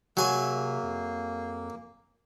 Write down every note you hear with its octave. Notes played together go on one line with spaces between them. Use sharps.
C3 F#3 A#3 G#4 E5 G#5
F2